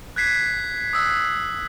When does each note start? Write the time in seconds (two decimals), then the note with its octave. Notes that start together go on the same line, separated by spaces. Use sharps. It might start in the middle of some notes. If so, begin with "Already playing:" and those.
0.16 F#6 G#6 B6 C7
0.93 D#6 E6 F#6